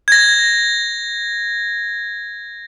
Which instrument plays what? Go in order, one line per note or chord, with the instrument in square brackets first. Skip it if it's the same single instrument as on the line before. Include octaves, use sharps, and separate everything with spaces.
[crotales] G#6 A#6